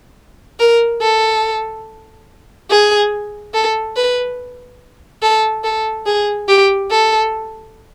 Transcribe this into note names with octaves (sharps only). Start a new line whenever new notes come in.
A#4
A4
G#4
A4
B4
A4
A4
G#4
G4
A4